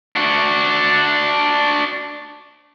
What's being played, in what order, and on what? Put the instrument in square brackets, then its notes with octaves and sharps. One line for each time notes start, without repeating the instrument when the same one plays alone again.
[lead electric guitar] D4 F#4